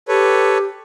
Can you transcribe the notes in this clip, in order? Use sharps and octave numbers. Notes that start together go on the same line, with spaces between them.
G4 A4 B4 C#5